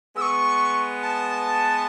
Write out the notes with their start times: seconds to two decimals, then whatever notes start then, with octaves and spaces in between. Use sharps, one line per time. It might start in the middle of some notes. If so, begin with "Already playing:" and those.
0.16 G#3 B3 E6
0.22 C#6
1.02 A5